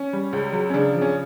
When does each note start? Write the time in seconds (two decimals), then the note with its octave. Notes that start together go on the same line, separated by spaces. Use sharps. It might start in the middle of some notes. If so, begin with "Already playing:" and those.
Already playing: C#4
0.13 G3
0.33 C#2
0.53 F#3
0.70 C#4
0.74 C#3 D4
0.93 F3
1.01 C#4